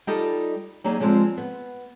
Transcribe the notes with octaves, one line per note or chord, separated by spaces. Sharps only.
G3 D#4 F4 G4 A4 D#5
F#3 G3 A#3 D#4 G#4
D3 F3 G3 G#3 C4
B3